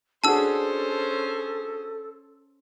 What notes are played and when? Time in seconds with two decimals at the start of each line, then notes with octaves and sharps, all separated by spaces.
0.24 C#4 D4 F#4 G#4 A4 C5 A5 E6